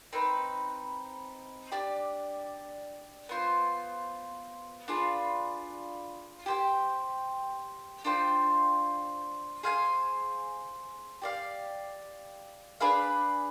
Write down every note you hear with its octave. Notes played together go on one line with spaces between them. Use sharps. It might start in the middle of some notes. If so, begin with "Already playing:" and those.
C4 D#4 B4
D4 G4 D5
B3 F4 C5
D4 F4 G#4 B4
G4 C5 G5
D4 F4 C5 G5
G#4 C5 F5 G#5
G4 D5 F5
D4 G#4 B4 F5